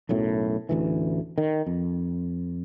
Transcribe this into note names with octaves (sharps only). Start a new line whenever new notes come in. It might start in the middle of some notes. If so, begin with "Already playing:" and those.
B1 F#2 A2
A1 D2 E3
D#3
F2